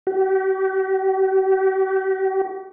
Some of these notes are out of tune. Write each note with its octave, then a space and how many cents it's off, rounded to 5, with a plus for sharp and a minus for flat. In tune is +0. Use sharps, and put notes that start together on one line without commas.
G4 -45